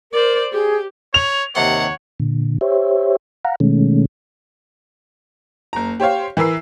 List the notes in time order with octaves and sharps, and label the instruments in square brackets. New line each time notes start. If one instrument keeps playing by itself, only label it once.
[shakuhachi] A#4 [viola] C5 D5
[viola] G4 [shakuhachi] G#4
[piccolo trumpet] C#5 [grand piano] F7
[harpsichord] D#2 C3 C6 [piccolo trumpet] C#5 [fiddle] F#5
[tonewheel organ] A#2 D3
G4 C5 C#5 E5
F5 F#5 A#5
B2 D#3 G#3 A3 C#4
[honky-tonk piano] F#1 A#5
G4 C5 C#5 F5
E3 A#4 B4 E6 C7